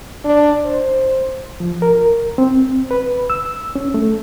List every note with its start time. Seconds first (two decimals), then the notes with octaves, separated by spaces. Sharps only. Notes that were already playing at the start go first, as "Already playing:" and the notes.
0.25 D4
0.65 C5
1.60 F3
1.82 A#4
2.38 C4
2.91 B4
3.30 E6
3.76 C#4
3.94 A3